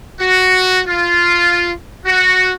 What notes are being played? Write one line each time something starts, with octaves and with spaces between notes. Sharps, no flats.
F#4
F4
F#4